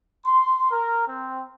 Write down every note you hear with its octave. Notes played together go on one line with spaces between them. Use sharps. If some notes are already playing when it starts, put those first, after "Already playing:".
C6
A#4
C4